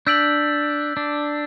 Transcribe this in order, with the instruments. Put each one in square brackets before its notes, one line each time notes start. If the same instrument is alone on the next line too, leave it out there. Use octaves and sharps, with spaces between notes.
[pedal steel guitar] D4 [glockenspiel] E6 G6 B6 D7 F#7
[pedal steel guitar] D4